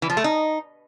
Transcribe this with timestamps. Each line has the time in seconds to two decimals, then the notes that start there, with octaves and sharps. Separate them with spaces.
0.02 E3
0.10 F3
0.17 A3
0.24 D#4